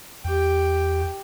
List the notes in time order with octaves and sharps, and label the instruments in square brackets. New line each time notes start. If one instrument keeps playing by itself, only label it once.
[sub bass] E2 [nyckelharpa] G4 G5